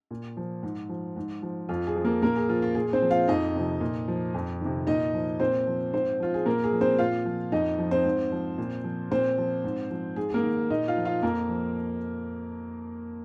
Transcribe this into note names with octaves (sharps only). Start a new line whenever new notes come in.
A#2
F3
G#2
F3
G#2
F3
F2 F4
G#4
F3
A#3 A#4
A#2 A#3 A#4
G#4
F3 F4
F4
A#2 G#4
C4 C5
F3
F4 F5
F2 D#4 D#5
C3 F3
A#2
F3
F2
C3 D#3
A#2 D#4 D#5
F3
A#2 C4 C5
F3
G#2 C4 C5
F3 F4
G#4
A#2 A#3 A#4
G#4
F3
C4 C5
A#2 F4 F5
F3
F2 D#4 D#5
F3
C4 C5
G#2
F3
A#2
F3
A#2 C4 C5
F3
G#2
F3
G#2 G#4
G#4
A#3 A#4
D#3
A#2 D#4 D#5
F4 F5
F3
F4 F5
F2 A#3 A#4
F3